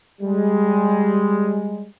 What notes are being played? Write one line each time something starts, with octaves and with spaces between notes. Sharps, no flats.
G3 G#3